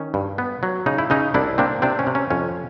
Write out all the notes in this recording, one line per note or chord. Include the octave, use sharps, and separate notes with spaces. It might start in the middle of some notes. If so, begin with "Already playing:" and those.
Already playing: D#3 C#4
G2
B3
F#3
C#3 D#4
E4
C#3 C#4 D#4
C2 D4 E4
A#3 C4 D4
C3 C4 D4
C#4
C3
C#4
F2 C#4